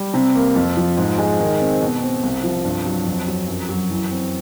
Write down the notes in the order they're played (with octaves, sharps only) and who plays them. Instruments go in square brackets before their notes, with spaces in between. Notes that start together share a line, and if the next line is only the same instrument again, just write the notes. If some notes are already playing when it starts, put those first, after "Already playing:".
Already playing: [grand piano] G3
C3
A#3
F2
F3
G#2
G#3
D#3
C4
B2
C4
C2
F3
G2
F#3
F2
F#3
F#2
F#3
E3
C4